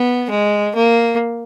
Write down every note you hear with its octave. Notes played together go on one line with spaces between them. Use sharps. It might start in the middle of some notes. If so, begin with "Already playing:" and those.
Already playing: B3
G#3
A#3